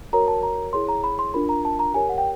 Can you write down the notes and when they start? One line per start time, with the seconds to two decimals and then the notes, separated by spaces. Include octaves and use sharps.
0.13 F#4 A#4 C#5 A#5
0.28 A5
0.43 A#5
0.73 E4 G#4 C#5 C6
0.89 A#5
1.04 B5
1.19 C6
1.34 D4 F4 A#4 B5
1.49 A#5
1.65 A5
1.79 A#5
1.94 G4 A#4 C#5 G#5
2.09 F#5
2.18 G5